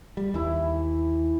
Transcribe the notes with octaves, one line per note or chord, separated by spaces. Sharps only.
G3
D#2 E3 E4